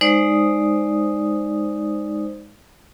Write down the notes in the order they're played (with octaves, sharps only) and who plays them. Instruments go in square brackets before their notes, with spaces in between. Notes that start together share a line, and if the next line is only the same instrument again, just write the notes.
[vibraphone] G#3 D#4 C5 D5 D#6